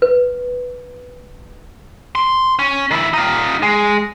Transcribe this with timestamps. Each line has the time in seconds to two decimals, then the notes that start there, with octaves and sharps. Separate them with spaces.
0.02 B4
2.15 C6
2.59 C#4
2.91 D#3 E4
3.13 D#4 F4
3.62 G#3